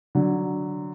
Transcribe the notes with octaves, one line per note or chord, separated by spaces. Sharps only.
D3 F#3